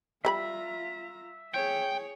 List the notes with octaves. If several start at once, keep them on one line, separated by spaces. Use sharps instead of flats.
G3 F4 B4 E5 A#5 B5
G#4 C#5 G5